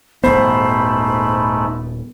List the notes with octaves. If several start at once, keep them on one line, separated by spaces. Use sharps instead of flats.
D#1 G#1 G#2 A3 B3 C5 B5